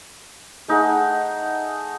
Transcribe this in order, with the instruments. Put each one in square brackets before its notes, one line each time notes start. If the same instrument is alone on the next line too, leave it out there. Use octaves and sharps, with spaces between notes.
[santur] A3 D#4 G#4 F#5